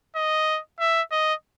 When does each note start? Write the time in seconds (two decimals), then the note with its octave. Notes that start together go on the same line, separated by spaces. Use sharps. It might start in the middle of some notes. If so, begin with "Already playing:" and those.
0.16 D#5
0.79 E5
1.11 D#5